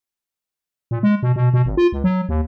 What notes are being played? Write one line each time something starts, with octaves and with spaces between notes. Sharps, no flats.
A#2
G#3
B2
B2
B2
G#1
F4
C#2
F#3
D#2